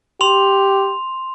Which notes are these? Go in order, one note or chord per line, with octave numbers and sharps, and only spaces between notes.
G4 C6 F7